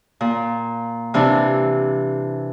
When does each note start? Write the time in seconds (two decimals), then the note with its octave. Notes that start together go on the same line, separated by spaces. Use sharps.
0.21 A#2
1.14 C3 E3 D4